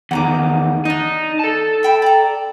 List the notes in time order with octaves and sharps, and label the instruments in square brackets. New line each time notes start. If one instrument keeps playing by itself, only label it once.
[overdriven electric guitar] E2 D#3 [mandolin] F#5 A#5 D6
[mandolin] D4 D#5 [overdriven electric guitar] D#4
[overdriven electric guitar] A4 A5
[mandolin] E5 G5 B5
D5 A#5